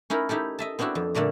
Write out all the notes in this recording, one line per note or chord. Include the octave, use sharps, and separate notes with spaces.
C#4 D#4 E4 A#4
D#4 E4 G4 A4
D#5 E5 A5
B3 C4 D4 E4 F#4
F2
A#2 D3 A3 D5 A#5